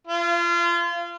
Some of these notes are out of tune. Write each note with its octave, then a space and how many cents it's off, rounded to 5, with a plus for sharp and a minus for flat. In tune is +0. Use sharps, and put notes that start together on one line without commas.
F4 -30